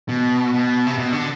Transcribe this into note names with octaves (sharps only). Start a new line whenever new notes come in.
B2
B2
C3
B2
D3